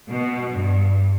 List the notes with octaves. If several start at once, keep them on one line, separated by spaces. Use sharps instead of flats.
B2
G2